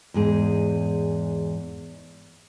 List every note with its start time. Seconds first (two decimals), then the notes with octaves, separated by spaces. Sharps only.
0.14 E2 G#2 G#4